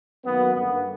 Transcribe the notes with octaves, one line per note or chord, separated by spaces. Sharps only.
F#2 D#3 F#3 A#3 B3
G2 D3 G3 A#3 B3